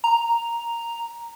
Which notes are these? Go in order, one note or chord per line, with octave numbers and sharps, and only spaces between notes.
A#5